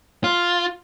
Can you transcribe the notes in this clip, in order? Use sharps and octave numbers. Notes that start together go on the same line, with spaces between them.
F4